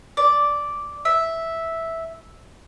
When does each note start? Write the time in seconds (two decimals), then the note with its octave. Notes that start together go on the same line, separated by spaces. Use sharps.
0.17 D5
1.05 E5